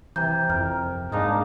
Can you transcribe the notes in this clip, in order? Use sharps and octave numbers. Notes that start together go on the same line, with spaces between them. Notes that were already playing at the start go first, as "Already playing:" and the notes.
C3 E3 A#5 G6
F2 A#4 F6
G#2 G#3 A#3 D4 D#4 F5 A5